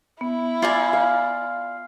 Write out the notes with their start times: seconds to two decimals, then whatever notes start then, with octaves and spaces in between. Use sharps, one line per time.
0.21 B3 E4
0.62 F4 D5 G#5
0.93 F5